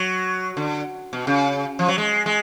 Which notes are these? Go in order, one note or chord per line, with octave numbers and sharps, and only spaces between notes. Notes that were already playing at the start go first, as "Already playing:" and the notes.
Already playing: F#3
D3
B2
C#3
F3
F#3
G#3
G#3